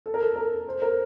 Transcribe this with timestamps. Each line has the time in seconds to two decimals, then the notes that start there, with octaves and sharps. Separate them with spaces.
0.06 A4
0.14 A#4
0.23 A4
0.36 A#4
0.68 C5
0.82 A#4